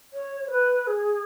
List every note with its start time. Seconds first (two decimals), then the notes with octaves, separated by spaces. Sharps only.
0.13 C#5
0.46 C#5
0.51 B4
0.87 G#4